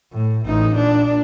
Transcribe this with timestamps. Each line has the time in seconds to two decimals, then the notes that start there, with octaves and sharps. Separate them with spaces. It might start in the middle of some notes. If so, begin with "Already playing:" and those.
0.12 A2
0.46 A1 D#4
0.76 A#2 D4